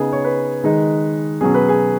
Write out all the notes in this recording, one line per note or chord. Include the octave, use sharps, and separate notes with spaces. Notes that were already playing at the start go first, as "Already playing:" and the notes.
Already playing: C#3 B3 D#4 G#4
C#5
B4
D#3 G#3 D#4
B2 F#3 C#4 G#4
B4
G#4